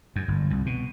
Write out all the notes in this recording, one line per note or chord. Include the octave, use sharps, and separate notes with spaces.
F#2
G1
C2
B2